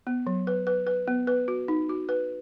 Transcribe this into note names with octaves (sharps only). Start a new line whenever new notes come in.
B3
F#3
B4
B4
B4
B3
B4
F#4
D#4
F#4
B4